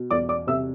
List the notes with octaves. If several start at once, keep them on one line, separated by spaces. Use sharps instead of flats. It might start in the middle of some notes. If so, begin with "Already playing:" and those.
Already playing: B2
E2 D5 D6
D5 D6
C3 E5 E6